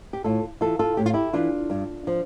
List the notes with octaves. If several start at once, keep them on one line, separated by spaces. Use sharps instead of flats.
G4
A2 F4 A4
E3 F4 A4
F4 A4
A2 G4
F4
E4 G4
E3 D4 F4
G2
F3